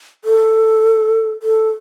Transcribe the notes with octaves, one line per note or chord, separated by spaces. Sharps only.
A4
A4